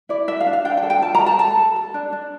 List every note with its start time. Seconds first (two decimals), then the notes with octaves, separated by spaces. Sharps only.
0.09 E4 D5
0.28 A4 E5
0.40 F5
0.46 D4
0.53 F5
0.65 D4 G5
0.77 G5
0.83 A4
0.90 G5
1.02 F4 A5
1.15 A#5
1.20 A4
1.26 A5
1.39 A4 A5
1.57 A4
1.76 A4
1.94 D4
2.13 D4